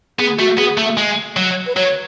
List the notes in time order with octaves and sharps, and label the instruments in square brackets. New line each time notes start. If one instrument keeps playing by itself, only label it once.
[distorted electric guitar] B3 [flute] G#4
[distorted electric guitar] A3 [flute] F#4
[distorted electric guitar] B3 [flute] G#4
[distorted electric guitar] A3
G#3
F#3
[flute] B4
[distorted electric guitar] F#3 [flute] C#5